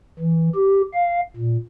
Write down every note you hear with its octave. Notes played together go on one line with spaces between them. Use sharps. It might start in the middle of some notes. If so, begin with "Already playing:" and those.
E3
G4
F5
A#2